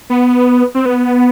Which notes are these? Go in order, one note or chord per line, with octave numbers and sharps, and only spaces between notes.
B3
C4
B3